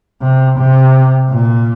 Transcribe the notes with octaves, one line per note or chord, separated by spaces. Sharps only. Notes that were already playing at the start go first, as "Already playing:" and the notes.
C3
C3
A#2